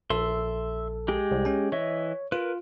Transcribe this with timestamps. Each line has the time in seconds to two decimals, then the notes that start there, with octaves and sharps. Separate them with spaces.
0.10 A#1 A4 E5 C6
1.08 G#3 G4 G#4
1.31 C2
1.45 C#4 G#5
1.72 E3 C#5 D#5 E5
2.32 F4 A#4 B4